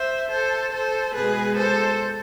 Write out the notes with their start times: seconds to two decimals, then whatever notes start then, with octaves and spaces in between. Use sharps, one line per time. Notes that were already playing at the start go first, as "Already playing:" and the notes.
Already playing: C5 E5
0.31 A4 C5
0.73 A4 C5
1.14 B2 G#3 G#4 B4
1.57 A4 C5